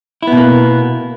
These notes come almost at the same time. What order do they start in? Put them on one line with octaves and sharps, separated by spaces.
E4 B3 B2 A#3